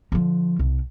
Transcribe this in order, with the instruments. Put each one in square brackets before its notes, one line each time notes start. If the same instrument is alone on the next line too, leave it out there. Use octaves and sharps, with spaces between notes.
[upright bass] D3 F3
C2